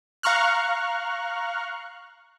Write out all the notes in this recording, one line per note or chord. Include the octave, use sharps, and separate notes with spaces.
F5 A#5 C#6 F6 F#6